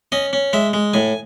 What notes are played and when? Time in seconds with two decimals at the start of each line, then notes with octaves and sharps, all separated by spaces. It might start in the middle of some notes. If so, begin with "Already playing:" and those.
0.12 C#4 D#5
0.33 C#4
0.53 G#3 E5
0.73 G#3
0.94 A2 G#5